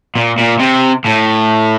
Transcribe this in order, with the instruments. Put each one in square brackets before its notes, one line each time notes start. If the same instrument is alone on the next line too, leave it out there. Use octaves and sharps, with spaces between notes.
[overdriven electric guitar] A#2
A#2
C3
A2